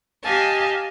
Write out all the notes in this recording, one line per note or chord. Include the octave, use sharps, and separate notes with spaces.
G4 D#5 F5 G#5 A5